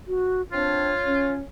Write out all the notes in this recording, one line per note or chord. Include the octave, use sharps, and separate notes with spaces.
F#4
C4 D4 F4 C#5
C#4